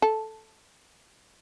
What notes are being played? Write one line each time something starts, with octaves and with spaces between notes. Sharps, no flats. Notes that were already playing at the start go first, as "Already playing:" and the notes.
A4